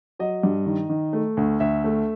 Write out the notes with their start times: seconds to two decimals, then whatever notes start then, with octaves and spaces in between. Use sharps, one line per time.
0.19 F#3 D#5
0.43 G2
0.66 D#3
0.90 D#3
1.13 A3
1.37 D2
1.60 D2 E5
1.84 A3